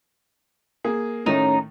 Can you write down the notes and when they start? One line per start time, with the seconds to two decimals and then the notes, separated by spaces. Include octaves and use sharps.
0.84 A#3 G#4
1.26 A2 D#3 A3 C#4 D#4